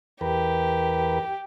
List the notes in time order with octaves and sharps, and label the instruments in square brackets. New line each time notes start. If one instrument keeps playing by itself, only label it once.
[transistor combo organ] E2 A#4 B4 [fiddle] G4